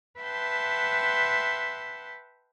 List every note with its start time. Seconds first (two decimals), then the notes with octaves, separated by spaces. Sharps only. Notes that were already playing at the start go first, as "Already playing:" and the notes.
0.21 B4 E5 F#5 G5 A5 C6